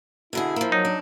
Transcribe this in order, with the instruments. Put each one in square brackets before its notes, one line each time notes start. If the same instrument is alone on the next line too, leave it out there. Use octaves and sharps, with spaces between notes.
[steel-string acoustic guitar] B2 D3 G#4 [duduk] E4
[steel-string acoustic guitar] F3 A#3
[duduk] F#3 [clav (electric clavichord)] D#4
[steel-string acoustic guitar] D4